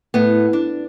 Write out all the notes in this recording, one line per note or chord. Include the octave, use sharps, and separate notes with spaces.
A2 B3
D4